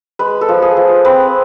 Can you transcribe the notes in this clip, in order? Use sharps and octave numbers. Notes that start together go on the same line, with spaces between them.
G#3 B4
A4
F3
G#4
F3
C4 B4